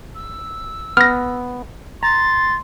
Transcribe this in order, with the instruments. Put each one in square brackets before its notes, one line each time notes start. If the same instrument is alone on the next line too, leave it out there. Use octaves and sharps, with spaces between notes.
[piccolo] E6
[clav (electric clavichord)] B3 [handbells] F6 A#6
[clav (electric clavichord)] A#5 [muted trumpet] C6 [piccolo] A6